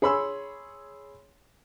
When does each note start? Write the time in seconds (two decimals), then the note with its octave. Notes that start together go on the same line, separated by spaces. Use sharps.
0.02 G#4 C#5 B5 C6 E6